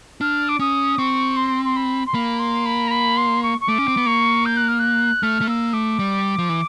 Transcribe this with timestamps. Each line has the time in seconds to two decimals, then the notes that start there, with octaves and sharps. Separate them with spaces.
0.21 D4 F6
0.48 D6
0.59 C#4 D#6
0.98 C4 C#6
1.36 C6
1.64 C6
1.76 B5
2.06 C6
2.14 A#3 B5
2.39 C6
2.65 B5
2.87 A#5
2.90 B5
3.17 C6
3.43 C#6
3.60 C#6
3.68 A3 D6
3.78 C#4
3.88 C4
3.97 B3
4.06 A#3 C#6
4.45 G6
4.56 F#6
4.68 F6
4.79 F#6
5.22 A3 F6
5.41 A3
5.47 A#3 E6
5.73 A3 D6
5.99 G3
6.38 F3
6.49 E3